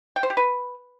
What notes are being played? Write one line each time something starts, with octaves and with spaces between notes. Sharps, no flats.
G5
C5
G4
B4